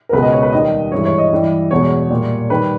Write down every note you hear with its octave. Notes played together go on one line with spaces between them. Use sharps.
A#4
C#2 B2 G#3 B4
D#5
C#5
B4
D#2 D#3 G3 D#5
G2 E3 G#3 C#5
C#5
D#5
G2 E3 G3
E2 B2 G#3 C#5
A#2 G3
D#3 G3 B4